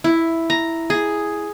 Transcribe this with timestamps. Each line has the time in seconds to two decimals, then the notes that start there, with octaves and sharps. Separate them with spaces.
0.04 E4
0.50 A#5
0.90 G#4